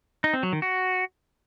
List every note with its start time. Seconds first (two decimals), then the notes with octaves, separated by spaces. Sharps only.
0.24 D#4
0.34 C4
0.43 F#3
0.53 D#3
0.62 F#4